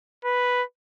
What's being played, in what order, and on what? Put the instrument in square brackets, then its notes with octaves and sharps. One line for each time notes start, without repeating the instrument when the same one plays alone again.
[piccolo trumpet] B4